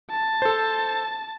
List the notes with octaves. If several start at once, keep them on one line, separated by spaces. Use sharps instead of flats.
A5
A4 C5